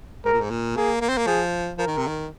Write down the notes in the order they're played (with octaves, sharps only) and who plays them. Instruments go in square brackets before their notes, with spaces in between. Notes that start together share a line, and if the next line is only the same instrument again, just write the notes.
[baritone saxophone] G#2 [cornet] A#4
[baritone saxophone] A#2
G#2
A#2
[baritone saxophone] A#3 [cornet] G#4
[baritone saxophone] A#3
C4
A#3
[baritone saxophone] F3 [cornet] G#4
[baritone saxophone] F3 [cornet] A#4
[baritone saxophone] D#3
C3
D#3